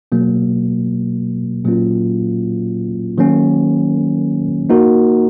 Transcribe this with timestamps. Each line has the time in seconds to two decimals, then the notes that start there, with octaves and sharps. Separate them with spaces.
0.12 B2 F#3 A#3
1.65 A#2 F#3 A#3 C#4 F4
3.18 D#3 F#3 A#3 C#4
4.70 A#3 D#4 F#4 A#4